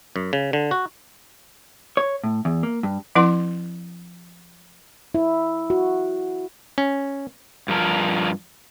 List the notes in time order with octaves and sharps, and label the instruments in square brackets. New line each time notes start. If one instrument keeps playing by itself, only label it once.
[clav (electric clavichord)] F#2
C#3
D3
F#4
[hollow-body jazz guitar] C#5
A2
E2
A#3
G2
[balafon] F3 C4 E4 B4 F#5 C6
[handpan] E4
F#4
[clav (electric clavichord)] C#4
[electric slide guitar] G2 F3 A#4